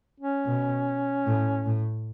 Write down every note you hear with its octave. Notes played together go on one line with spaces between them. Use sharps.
C#4
B2
A2
A2